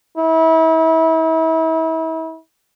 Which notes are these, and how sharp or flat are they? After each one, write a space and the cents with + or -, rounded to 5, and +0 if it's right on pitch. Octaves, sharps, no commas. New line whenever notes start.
E4 -35